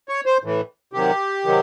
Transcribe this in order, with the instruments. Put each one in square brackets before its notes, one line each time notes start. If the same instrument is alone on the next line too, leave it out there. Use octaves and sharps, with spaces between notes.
[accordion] C#5
C5
A2 E3
C3 D#3 F#3 G4
C3 D#3 F#3